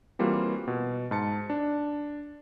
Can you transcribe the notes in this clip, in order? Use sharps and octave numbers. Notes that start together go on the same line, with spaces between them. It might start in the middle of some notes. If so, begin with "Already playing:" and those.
E3 G3 A#3 C4 F4 F#4
B2
G#2 A5 C#7
D4